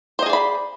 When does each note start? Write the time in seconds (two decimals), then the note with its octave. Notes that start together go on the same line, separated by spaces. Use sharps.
0.19 C5
0.22 D#5
0.26 G#4
0.30 D5
0.33 B5